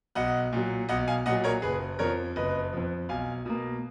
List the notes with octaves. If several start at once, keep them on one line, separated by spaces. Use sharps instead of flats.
B1 D#5 F#5
A#2 F#3
B1 D#5 F#5
F5 G#5
A#2 F#3 D#5 F#5
A#4 C#5
F#1 G#4 B4
F2 F3 A#4 C#5
F#1 B4 D#5
F2 F3
B1 F5 G#5
B2 A#3